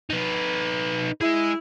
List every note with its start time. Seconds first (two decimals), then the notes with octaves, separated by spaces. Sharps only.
0.10 D#4 B4
1.21 G#3 E4 G#4